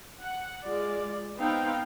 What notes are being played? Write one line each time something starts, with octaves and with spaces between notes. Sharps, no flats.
F#5
G#3 F4 D5
B3 C4 D#4 F5 G5